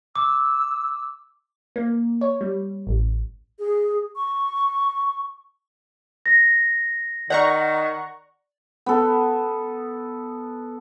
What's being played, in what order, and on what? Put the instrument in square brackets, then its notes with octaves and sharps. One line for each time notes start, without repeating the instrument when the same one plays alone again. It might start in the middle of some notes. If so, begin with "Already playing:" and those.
[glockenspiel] D6 [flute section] E6
[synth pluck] A#3
C#5
G3
A1
[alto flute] G#4
C#6
[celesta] A#6
[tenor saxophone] D#3 [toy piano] D5 [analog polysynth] F#5 A#5 C#6
[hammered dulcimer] B3 A4